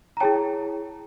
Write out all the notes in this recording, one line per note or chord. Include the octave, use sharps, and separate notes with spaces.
A#5
E4 G#4 C#5 G5 A5